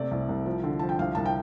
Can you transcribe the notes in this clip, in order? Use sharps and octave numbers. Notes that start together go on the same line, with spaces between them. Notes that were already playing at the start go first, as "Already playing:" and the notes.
Already playing: C3 A3 D5
C2
C2
F3
D3
F3 A5
G5
C2 F5
C2 A5
G5